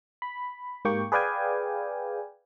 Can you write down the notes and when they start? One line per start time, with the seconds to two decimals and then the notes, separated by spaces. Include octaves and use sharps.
0.22 B5
0.85 G#2 A#3 G4 G5 C#6
1.12 G#4 B4 D5 F5 G5 G#5